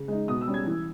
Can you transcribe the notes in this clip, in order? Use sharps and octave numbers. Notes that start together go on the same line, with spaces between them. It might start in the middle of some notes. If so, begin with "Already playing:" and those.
Already playing: C#3
G#3 D#4
B2 D#6
E6
G3 C#4
G#6
E3